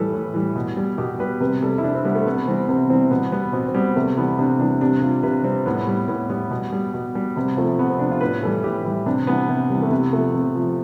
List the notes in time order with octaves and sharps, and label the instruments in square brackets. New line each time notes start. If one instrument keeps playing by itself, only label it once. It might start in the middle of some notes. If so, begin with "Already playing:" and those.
Already playing: [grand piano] A2 E3 G3 A4 B4
A2
E3 G3
B2
G3
B2 G4
G3 B4
C3 B4
G3 A4
E4
C3 D4
C4
G3 B3
A3
C3 B3
E3 G3 C4
C3 B3
E3 G3 C4
B2 B3
G3 B3
B2 C4
C4
G3 B3
C3 A3
E3 G3 B3
C3 D4
E3 G3 D4
C3 D4
G3 F4
C3 B4
G3 C4
A2 B3
G3
A2 B3
G3 B3
B2
G3
B2
G3
C3 B3
F3 A3
C3 B3
C4
F3 D4
F4
A2 B4
E3 G3 A4
A2 G4
E3 G3 E4
C3 D4
E3 G3 B3
C3
E3 G3
A3
C3 B3
F3 A3
C3
F3